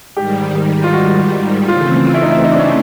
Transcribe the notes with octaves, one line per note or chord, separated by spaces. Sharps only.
G#2 D#3 G3 G4
F4
F#4
C#3 E3 A3 C4 F4
F4
E4
D#4
E4
D#4
D4
C#4
D4